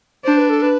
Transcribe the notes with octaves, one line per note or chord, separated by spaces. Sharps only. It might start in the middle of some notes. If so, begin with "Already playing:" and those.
D4 C5
B4
A4
B4